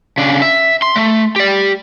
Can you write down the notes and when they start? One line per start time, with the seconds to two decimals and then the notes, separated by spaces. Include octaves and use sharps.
0.18 C#3 D4
0.42 E5
0.82 C6
0.96 A3
1.36 G4 D5